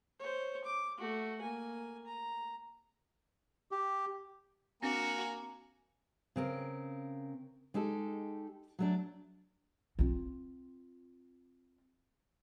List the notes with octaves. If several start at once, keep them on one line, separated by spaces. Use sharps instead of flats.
C5 C#5
D6
A3 F#4
A#3 G#5
A#5
G4
A#3 C4 D4 F#4 G#5 A#5
C#3 C4 A#4
G#3 D#4 G4 A4
F#3 A3 D4
C4 F4